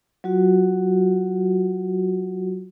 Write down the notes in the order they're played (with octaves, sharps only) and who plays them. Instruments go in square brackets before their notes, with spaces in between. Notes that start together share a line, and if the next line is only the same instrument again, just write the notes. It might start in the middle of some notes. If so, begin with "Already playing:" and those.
[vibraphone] F#3 F4 F#4